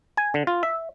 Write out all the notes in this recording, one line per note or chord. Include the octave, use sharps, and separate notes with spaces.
G#5
D3
F4
E5